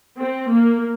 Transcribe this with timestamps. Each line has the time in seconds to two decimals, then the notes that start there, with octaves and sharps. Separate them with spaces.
0.18 C4
0.49 A#3